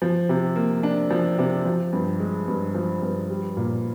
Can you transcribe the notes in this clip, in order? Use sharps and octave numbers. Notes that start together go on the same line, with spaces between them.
F3
C3
A#3
D4
F3
C3
F3
G2
G#3
G2
F3
G2
G3
A#2